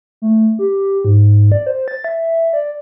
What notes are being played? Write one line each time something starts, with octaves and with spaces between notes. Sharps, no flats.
A3
G4
G#2
D5
C5
A6
E5
D5